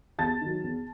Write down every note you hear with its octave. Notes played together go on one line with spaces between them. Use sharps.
E2 A5 A6
D#3 F#3
E2